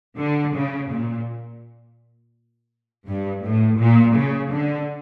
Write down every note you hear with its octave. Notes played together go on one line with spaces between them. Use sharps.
D3
C#3
A#2
G2
A2
A#2
C#3
D3